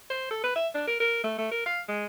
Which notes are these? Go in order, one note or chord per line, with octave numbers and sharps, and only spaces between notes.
C5
A4
B4
E5
D4
A#4
A#4
A3
A3
A#4
F5
G#3